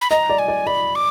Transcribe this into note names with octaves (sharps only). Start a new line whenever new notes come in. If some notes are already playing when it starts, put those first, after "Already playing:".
B5
D#5 A#5
D5
G#5
D5
D5 B5
D6